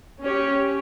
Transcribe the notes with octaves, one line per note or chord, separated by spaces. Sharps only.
C#4 G4 C#5